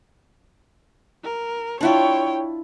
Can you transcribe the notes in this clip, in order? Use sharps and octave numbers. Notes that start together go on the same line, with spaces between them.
A#4
D4 E4 F4 C#5 G5